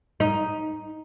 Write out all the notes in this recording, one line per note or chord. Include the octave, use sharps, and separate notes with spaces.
D#4